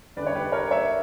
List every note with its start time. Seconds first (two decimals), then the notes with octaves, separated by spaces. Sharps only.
0.16 E2 D3 G3 B4 D5
0.27 C#5
0.35 G4 B4
0.52 A#4 C#5
0.71 C#5 E5